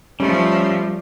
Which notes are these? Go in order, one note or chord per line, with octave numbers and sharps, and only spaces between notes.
F3 G3 A3 C#4